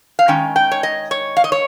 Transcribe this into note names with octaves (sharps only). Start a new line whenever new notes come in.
F5
D#3 G#3 C#4 G5
G5
C#5
D#5
C#5
F5
D#5
C#5